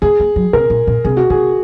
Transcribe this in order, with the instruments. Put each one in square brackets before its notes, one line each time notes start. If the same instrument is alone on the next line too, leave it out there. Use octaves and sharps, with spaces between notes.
[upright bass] A#3 [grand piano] G#4
[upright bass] A#3
F#3
[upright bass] C3 [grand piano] A#4
[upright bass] A#2
A#2
[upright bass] C3 [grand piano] G#4
[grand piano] F#4
[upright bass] C3 [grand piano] G#4